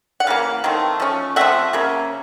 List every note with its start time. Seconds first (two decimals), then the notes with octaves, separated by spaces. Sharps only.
0.20 F#5
0.27 C#3 E3 A#3 F5
0.64 D#3 F#3 A3 C4
1.00 F3 A3 C#4
1.36 F3 A3 C4 E5 F#5
1.73 C#3 F#3 A#3 C#4